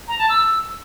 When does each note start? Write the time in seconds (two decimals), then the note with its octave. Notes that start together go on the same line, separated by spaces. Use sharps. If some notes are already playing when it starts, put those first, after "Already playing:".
0.08 A#5
0.19 A5
0.29 E6